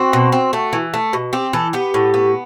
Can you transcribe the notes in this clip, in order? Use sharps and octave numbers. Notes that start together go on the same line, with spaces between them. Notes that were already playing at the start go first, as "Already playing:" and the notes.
Already playing: C4 F#4
B2
C4
A3
E3
A3
B2
C4 G4
E3 A4
B3 G4
A2
B3